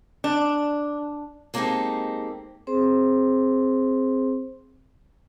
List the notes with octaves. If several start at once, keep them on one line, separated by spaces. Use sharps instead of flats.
D4
G#3 A#3 C4 D#4 G4 A4
C4 G#4 C5 C6